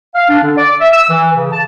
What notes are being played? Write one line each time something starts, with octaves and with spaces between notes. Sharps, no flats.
F5
D4
D3
D5
E5
E6
E3
C#3
A5